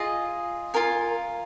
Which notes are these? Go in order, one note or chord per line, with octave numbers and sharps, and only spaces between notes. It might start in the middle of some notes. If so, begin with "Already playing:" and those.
Already playing: F4 G#4 D#5
F4 A#4 G#5